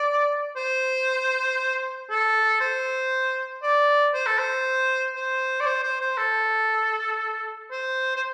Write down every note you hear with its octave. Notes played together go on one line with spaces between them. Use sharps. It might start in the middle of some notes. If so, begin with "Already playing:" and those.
Already playing: D5
C5
A4
C5
D5
C5
A4
C5
C5
D5
C5
C5
C5
A4
C5
C5